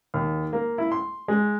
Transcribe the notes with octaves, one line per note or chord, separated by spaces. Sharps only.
D#2
A#3
E4
C6
G#3